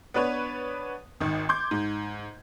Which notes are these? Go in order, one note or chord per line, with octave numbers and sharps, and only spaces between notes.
B3 D4 B4 C#5
G#1 D#3
C6 D6 G6 G#6
G#2